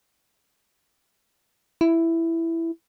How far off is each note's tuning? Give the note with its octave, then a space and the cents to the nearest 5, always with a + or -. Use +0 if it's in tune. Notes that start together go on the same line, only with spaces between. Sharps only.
E4 +5